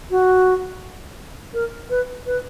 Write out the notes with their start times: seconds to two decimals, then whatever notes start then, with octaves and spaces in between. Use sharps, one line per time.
0.11 F#4
1.54 A#4
1.90 B4
2.26 B4